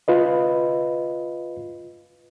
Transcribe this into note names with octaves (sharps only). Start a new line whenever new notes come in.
F4 B4 D#5